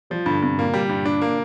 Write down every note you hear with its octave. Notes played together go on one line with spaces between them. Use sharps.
F3 G3
G2 D3
G2 C3
A#2 A#3
G3
G2
D4
A#3